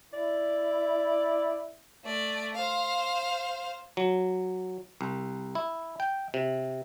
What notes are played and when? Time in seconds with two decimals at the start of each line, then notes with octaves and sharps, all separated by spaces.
0.14 E4 D5
2.04 A3 D5
2.55 C5 F5
3.97 F#3
5.01 C2
5.55 E4
6.00 G5
6.34 C3